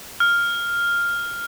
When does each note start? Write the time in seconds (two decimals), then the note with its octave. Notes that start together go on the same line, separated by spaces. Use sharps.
0.20 F6